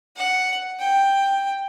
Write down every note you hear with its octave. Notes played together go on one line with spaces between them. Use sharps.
F#5
G5